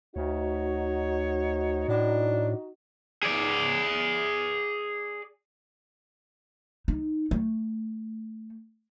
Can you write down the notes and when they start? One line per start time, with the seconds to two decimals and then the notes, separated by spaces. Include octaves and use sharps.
0.16 D2 D#4 F#4 C#5
1.88 A2 D4
3.23 G#4 D5
6.88 D#4
7.31 A3